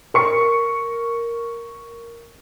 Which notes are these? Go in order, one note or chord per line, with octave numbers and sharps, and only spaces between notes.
A#4 C#6 C#7